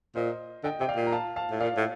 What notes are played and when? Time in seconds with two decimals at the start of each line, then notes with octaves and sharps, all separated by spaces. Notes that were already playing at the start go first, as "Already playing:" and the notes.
0.15 A#2 C5 D#5
0.64 D3 D#5 G5
0.80 C3 G5
0.88 D5 F5
0.96 A#2
1.07 A#5
1.12 F5 A5
1.36 F5 A5
1.51 A2
1.61 A#2 D5 F5
1.77 A2